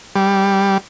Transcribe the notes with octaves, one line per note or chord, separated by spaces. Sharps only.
G3